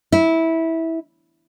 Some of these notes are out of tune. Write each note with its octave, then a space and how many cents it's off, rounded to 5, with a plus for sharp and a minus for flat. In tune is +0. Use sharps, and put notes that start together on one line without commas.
E4 -15